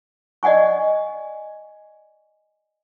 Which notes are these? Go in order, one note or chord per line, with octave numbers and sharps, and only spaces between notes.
D5 D#5 F#5 G#5 C#6